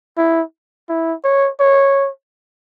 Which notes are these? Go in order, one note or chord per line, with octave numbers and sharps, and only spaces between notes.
E4
E4
C#5
C#5